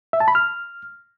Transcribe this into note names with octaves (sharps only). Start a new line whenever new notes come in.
E5
A5
B5
F6